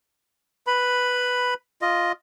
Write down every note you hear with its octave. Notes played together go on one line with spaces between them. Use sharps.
B4 B5
F4 D#5